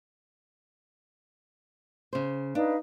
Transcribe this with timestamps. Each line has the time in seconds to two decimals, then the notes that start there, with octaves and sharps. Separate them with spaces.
2.13 C#3 C5
2.55 D4 D#4 B4 F5